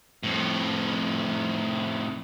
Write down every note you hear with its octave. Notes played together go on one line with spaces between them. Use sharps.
F2 A2